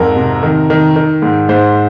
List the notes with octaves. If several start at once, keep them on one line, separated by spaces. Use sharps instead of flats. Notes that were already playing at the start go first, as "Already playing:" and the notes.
Already playing: F2 G#2 A#4
C3
D#3
D#3
D#3
G#2
G#2 C5